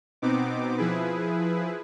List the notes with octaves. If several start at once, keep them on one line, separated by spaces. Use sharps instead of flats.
B2 B3 C4 D#4 D6
F3 E4 G#4 B4